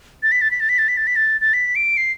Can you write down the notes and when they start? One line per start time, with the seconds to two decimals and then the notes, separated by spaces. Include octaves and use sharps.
0.23 A6
0.32 B6
0.41 A6
0.51 B6
0.60 A6
0.69 B6
0.78 A6
0.88 B6
0.97 A6
1.07 B6
1.16 A6
1.41 A6
1.53 B6
1.75 D7
1.97 C7